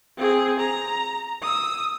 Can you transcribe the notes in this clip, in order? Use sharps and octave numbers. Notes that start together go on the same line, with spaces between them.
C4 G#4
A#5
D#6 E6